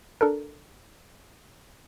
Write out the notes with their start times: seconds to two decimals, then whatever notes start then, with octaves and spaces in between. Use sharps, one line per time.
0.21 D4 A4 A#4